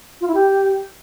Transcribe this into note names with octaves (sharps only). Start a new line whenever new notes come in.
F4
E4
G4